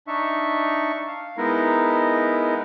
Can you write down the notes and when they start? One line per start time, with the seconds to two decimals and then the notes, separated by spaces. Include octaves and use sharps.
0.07 D4 D#4 E5 C#6
1.07 F5
1.37 G#3 B3 D#4 E4 A#4